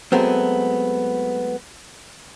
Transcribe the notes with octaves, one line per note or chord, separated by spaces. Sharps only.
F#3 G#3 A3 B3 C4